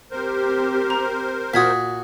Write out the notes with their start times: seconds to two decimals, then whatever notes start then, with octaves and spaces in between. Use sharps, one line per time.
0.11 C4 G4 A#4 C5
0.90 A#5
1.54 A#2 F#4 D#6 G#6 B6